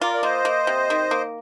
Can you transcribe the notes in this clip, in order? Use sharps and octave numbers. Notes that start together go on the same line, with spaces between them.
F4 A#4 D5
D5
A#3 C5 D#5
A#3
C3
D#3
A#3